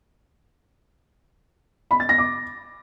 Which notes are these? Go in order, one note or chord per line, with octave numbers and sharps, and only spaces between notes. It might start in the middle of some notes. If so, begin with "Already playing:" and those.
B5
A6
A#6
D6